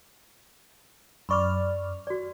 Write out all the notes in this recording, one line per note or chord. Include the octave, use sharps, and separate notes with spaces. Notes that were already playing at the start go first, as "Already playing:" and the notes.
F#2 D5 B5 C#6 D6 F6
F#4 D5